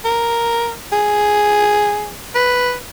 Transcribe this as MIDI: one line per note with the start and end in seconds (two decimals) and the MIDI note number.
0.05 0.72 70
0.92 2.14 68
2.35 2.76 71